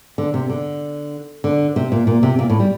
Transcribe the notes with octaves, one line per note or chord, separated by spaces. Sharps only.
D3
C3
D3
D3
C3
A#2
A#2
C3
A#2
A2
G3